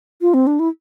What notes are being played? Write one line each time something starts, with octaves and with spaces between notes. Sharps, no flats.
F4
C4
D4
E4